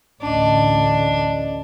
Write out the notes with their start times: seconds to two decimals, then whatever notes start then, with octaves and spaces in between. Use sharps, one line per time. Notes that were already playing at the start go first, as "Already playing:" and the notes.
0.22 A1 D2 C#4 D4 D#5